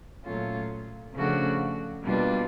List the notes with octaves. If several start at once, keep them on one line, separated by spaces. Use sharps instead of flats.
A#2 F#3 A3 C#4 F4
C#3 F3 A3 D4 F#4
B2 G3 A#3 D4 F4